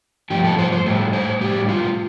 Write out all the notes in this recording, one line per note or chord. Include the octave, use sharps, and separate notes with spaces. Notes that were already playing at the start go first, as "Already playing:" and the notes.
G2 F3 A3 G4
A4
C5
C5
A2 G3 A4
C5
A2 G3 G4
F4